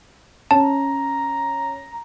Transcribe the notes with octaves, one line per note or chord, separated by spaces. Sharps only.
C#4 A5 A#5